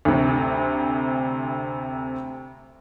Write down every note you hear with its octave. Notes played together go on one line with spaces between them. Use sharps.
D2 C3